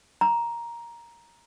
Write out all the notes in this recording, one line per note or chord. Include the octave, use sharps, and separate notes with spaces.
A#5